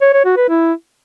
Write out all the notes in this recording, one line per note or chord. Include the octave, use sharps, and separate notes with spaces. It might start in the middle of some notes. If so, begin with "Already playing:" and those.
C#5
C#5
F#4
B4
E4